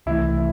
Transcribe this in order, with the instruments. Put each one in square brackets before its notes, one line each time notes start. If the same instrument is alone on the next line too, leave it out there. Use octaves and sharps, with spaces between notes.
[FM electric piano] C2 C3 E3 A3 [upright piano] E4